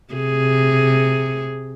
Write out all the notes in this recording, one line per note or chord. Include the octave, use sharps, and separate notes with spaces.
C3 G#4